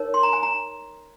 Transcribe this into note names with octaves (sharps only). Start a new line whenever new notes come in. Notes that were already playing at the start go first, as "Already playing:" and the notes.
Already playing: D#4 A#4 C#5
C6
A#5
G#5
A#5